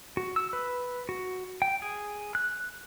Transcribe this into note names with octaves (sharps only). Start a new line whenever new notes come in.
F#4
E6
B4
F#4
G5
G#4
F#6